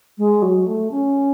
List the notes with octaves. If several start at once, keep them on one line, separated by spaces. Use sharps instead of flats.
G#3
F#3
A3
C#4